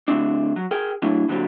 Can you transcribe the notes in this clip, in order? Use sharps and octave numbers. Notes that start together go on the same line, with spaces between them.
D3 A3 C4 D4
F#3
G#4 A#4 G5
F#3 A3 D4 E4
A#2 D3 F#3 G3 C4